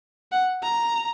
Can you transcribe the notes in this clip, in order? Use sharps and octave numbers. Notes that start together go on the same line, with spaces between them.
F#5
A#5